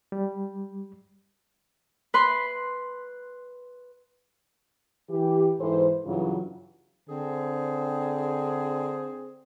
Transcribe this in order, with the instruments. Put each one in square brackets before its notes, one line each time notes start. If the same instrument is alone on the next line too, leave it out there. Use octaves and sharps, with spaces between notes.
[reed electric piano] G3
[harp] B4 B5 C6
[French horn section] E3 G4
G#2 E3 A4 C5
G2 C#3 E3 F#3 F4
[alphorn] D3 [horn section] C4 G#4